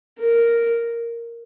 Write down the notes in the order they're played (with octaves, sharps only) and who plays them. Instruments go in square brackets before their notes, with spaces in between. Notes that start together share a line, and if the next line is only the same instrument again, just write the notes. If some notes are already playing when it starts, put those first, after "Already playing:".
[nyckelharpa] A#4